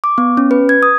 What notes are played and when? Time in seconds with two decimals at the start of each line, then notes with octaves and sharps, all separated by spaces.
0.04 D6
0.18 B3
0.37 C#4
0.51 B4
0.69 G#6
0.83 D#6